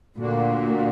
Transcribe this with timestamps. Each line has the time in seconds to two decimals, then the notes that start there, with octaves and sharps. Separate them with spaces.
0.16 D2 A#2 D3 A#3 D4 F#4